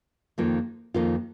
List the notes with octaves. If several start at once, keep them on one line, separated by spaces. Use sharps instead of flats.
F2 D#3 A#3 F4
F2 D#3 A#3 F4